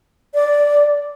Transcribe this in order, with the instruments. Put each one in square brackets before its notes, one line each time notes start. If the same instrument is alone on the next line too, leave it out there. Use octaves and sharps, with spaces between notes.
[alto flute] D5